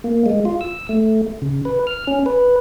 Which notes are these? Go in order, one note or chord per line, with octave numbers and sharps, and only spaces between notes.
A#3
G#3
F4
E6
A3
C#3
B4
F6
C#4
B4